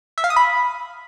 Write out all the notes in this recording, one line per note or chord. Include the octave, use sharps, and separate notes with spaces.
E5
F5
D#6
B5